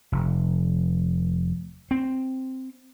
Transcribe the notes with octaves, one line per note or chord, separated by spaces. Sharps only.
F1
C4